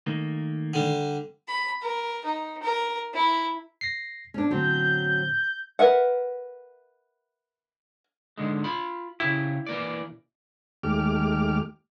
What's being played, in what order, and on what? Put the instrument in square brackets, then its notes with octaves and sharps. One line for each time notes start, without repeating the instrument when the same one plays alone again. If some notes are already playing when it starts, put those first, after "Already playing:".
[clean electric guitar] D#3 A3 A#3
[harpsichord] D3 G3
[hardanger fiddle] B5
A#4
D#4
A#4
E4
[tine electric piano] A#6 C7
[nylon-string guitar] C#4 D4
[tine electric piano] A2 D3 [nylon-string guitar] F#3 C4 [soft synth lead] G6
[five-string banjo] A#4 B4 E5 F#5
[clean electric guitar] G#2 D3 G#3
F4 B5
[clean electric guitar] C#3 G4 [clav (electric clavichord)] E4
[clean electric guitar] E3 A#3 D5
[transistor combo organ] D#2 G#3 A3 G4 D6 F6